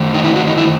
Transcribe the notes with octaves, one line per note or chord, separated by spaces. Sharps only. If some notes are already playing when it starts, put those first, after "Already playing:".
Already playing: D#3 A3
D#4
E4
F#4
D#4
E4